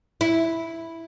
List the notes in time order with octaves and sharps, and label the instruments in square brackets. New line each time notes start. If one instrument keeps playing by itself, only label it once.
[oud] E4